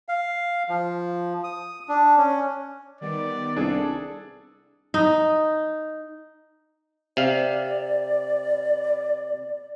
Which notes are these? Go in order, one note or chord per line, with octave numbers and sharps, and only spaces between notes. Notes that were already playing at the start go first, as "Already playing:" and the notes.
F5
F3
D#6
D4
C#4
D#3 G3 B3 D5
C2 D4 G#4 A4
D#4
C3 D5 F5